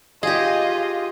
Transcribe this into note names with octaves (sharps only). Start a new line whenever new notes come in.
F4 G4 G#4 D#5